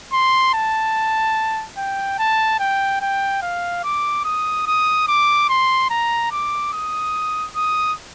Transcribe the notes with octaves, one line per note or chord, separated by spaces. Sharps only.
C6
A5
G5
A5
G5
G5
F5
D6
D#6
D#6
D6
C6
A#5
D6
D#6
D#6